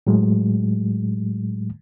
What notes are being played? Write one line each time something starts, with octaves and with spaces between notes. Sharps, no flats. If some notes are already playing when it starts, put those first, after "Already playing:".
A2 F#3 G#3